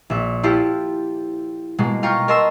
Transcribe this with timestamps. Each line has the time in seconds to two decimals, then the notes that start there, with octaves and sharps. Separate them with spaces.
0.10 A#1 E5
0.43 E4 F4 G4 A4 C5
1.78 B2 G#3 A#3
2.03 F4 F5 G5 A#5 C#6
2.28 A#4 D#5 A5 C6 E6